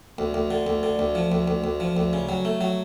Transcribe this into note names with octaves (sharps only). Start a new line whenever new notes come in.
D2
D2
D3
D2
D3
D2
F3
D2
D2
D2
F3
D2
C#3
F#3
A3
F#3